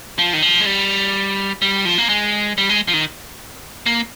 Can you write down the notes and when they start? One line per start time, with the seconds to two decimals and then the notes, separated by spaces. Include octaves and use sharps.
0.19 F3
0.33 D#3
0.42 F3
0.60 G#3
0.66 G3
1.62 G3
1.85 F3
1.98 A#3
2.09 G#3
2.58 G3
2.69 G#3
2.88 F3
2.94 D#3
3.86 A#3